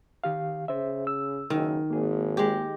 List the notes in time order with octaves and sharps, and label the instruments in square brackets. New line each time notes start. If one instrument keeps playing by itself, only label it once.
[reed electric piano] D#3 G4 F5
[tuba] C#3 [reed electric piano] C5 E5
[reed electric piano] E6
[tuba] F#1 [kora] D#3
[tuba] G#1 [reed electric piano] A#3 G#4
[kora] G#3 G4